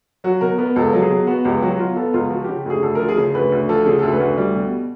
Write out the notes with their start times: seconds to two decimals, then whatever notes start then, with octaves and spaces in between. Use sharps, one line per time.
0.24 F#3 F#4
0.41 B2 A#4
0.58 B3 A#4
0.76 C#2 A4
0.93 F#3
1.02 G#4
1.10 B2
1.27 B3 F#4
1.45 C#2 G4
1.62 F#3 F#4
1.79 B2 F4
1.96 B3 A4
2.14 C#2 F4
2.30 F3 F#4
2.44 C#3 G4
2.66 D2 G#4
2.83 D2 A4
2.95 F3 A#4
3.09 G#4
3.17 C#3
3.34 D2 B4
3.52 D2
3.69 F3 A4
3.86 C#3 G#4
3.99 D2 A4
4.12 B4
4.20 D2
4.38 G3
4.55 B2